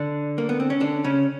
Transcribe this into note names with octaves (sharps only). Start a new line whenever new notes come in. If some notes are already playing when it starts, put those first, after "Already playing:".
Already playing: D3 D4
A#3
B3
C4
C#4
D3 D4
C#3 C#4